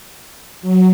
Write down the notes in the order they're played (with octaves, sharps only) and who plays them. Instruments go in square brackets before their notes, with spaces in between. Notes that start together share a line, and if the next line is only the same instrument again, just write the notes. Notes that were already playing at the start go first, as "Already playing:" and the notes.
[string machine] F#3